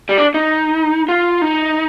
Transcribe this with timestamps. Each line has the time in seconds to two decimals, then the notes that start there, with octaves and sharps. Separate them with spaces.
0.09 G3
0.18 D4
0.34 D#4
1.08 F4
1.42 D#4